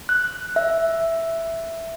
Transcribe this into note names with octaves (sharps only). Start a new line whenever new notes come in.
F#6
E5